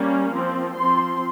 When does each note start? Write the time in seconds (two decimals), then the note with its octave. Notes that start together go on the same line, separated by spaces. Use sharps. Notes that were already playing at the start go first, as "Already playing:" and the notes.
Already playing: G3 A#3 C#4
0.32 F3 C4
0.77 F3 C4 C6